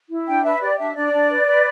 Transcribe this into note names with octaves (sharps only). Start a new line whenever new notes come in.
E4
D4 G5
B4 E5
G4 D5
D4 E5
D4 D5
D4
B4
B4